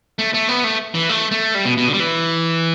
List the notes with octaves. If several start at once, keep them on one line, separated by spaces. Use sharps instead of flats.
A3
A3
B3
A3
E3
A3
A3
G3
B2
B2
D3
G3
E3